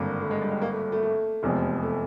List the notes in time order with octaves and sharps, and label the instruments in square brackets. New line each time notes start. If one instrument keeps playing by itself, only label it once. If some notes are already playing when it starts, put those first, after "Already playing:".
Already playing: [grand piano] G#1 G2 D3 [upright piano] A#3
[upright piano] A3
G#3
G3
G#3
A#3
A3
A3
A3
[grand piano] F1 E2 C3 F3 G#3
[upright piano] A3